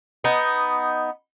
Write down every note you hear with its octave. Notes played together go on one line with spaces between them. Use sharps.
B3 D#4